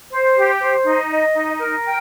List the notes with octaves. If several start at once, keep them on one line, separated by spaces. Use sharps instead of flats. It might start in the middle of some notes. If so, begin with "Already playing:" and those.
C5
G4
C5
D#4
D#5
D#4
A#4
G5